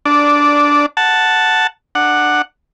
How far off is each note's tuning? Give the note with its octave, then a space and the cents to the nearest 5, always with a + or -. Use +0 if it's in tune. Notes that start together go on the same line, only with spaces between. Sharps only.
D4 -10 D5 +0
F#5 +0 A5 +0
D4 +20 F#5 +0